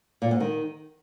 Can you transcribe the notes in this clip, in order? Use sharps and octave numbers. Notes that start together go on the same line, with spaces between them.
A#2
G#2
D#3